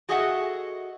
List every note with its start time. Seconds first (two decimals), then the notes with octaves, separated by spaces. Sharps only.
0.09 F#4 G#4 A4 D#5 E5 F#5